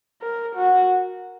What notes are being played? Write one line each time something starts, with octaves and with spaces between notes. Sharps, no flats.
A#4
F#4